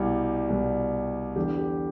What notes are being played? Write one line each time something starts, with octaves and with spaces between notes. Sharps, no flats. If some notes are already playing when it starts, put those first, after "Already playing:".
Already playing: C2 B2 G3
C2 B2 G3
E2 D3 G3 G4
G4